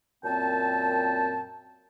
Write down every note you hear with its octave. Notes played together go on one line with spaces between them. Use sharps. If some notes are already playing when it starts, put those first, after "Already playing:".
F#2 A#2 C4 G5 A5